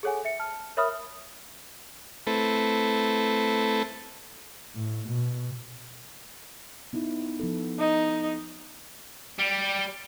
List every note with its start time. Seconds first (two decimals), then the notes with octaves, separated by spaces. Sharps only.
0.03 G#4 A4 C#5 F#5 G#5
0.25 E5 C#7
0.39 A5 F6
0.77 A#4 C#5 E5 B5 D#6 F6
2.27 A3 C4 E4 A4 B4
4.76 A2
5.08 B2
6.93 B3 D#4 E4
7.39 F3 B3 A4
7.79 D#4
9.39 G3